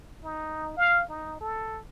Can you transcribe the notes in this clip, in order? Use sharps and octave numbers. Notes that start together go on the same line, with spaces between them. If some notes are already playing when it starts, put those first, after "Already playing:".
D#4
F5
D#4
A4